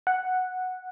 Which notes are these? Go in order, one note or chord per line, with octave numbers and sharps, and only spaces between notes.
F#5